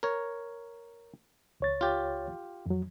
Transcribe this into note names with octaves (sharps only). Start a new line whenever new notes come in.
A#4 C#5
C#2 C#5 A6
F4 G4
F2 F#3